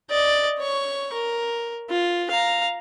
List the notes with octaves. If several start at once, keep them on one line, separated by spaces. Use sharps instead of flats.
D5 D#5
C#5 C#6
A#4
F4
F5 A#5